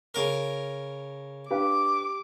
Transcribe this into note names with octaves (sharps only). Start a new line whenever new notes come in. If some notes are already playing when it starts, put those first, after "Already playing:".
C#3 A#4
D4 G4 B4 F5 D6